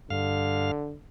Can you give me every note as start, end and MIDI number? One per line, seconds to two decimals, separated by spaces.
0.10 0.71 43
0.10 0.95 50
0.10 0.71 77